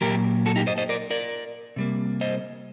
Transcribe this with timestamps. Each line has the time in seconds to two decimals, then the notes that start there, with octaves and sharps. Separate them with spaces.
0.01 A#2 F#3 A#3 G4 A#4
0.46 F#4 A4
0.56 D#4 G4
0.67 C5 D#5
0.78 C5 D#5
0.89 A#4 D5
1.10 A#4 D5
1.76 C3 G3 A#3
2.21 C5 D#5